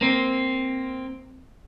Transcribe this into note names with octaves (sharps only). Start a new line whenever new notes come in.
A#3 C4